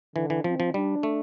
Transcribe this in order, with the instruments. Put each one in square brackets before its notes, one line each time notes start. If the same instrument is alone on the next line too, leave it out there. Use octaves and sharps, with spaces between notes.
[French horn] D3 [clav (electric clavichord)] E3
[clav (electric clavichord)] E3
[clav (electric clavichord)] F3 [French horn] C4
[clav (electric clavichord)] F3
[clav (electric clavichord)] G3 [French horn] D4
[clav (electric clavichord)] A3